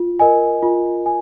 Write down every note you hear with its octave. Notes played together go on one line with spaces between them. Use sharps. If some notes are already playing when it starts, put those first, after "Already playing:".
Already playing: F4
A#4 D#5 G#5
F4
G#5